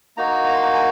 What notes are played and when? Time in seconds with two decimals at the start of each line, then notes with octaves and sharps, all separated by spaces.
0.17 A#3 D#4 F#4 A#5
0.46 A#5
0.55 C6
0.63 A#5
0.74 G#5